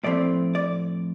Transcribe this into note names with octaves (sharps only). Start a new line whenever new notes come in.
A2 F3 A3 C4 D5
D5